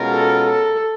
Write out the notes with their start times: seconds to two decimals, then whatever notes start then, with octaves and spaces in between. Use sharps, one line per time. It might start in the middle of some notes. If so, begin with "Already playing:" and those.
Already playing: B2 G#3 C#4 F4 A#4
0.12 A4
0.44 A4